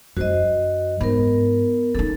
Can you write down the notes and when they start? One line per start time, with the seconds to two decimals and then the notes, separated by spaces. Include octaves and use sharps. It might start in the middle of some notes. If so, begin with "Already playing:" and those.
0.17 F#2 F#3 F#4 C5 D#5
1.01 G#2 B3 A#4
1.95 C#4 D#4 A4